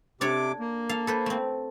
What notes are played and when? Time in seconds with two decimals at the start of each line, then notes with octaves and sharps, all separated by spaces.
0.21 C3 D4 A4 C#5 D6
0.60 A#3
0.89 A4 F5
1.07 A4 B4 C5
1.26 A3 C4